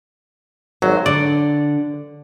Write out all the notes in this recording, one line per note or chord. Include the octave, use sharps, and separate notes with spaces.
G#1 F#3 C5
D3 D5